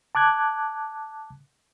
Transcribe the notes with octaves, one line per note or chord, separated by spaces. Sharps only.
A5 D6 F#6 G#6